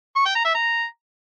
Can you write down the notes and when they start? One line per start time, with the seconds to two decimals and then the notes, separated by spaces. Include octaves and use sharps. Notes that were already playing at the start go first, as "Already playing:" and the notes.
0.16 C#6
0.26 G5
0.35 A#5
0.45 E5
0.55 A#5